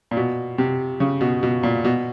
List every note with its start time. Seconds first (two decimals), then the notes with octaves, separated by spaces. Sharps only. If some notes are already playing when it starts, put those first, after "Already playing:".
0.11 A#2
0.17 B2
0.58 C3
1.00 C#3
1.21 B2
1.43 B2
1.63 A#2
1.84 B2